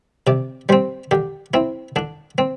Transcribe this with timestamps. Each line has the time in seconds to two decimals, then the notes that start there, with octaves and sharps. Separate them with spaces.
0.27 C3 D5
0.69 G3 C4 C5
1.11 D3 G4
1.54 C4 E4
1.96 D3 D4
2.38 C4